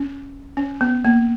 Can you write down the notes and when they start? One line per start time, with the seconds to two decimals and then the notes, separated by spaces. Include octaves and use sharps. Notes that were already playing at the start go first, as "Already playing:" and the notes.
Already playing: C#4
0.57 C#4
0.81 B3
1.05 A#3